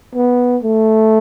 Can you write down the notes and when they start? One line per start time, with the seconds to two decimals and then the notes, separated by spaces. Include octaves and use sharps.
0.15 B3
0.63 A3